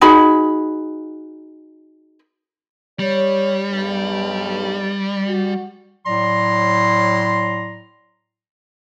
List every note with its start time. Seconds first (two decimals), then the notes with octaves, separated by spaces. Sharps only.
0.01 D#4 F#4 G#4 B5
2.99 G3 C#5
3.70 B1 G2
5.26 F#4
6.06 A2 F#3 D5 A#5 C6